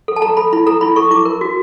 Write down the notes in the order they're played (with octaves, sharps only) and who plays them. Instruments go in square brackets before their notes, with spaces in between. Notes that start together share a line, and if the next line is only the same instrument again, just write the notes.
[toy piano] A4
A5
A4 A#5
A4 B5
E4 B5
A4 A#5
E4 B5
A4 C#6
E4 D6
A#4
F#4